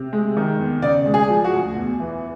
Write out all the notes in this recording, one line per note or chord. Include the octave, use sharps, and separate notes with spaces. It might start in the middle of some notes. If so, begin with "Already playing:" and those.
Already playing: C3
G#3
D#3
E2
C#3 D5
G#3
G#4
F3
F#4
D2
E2
E3